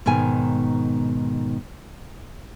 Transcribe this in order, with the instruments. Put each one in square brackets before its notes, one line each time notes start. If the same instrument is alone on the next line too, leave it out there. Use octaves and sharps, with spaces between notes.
[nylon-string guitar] G#2 B2 D#3 G#5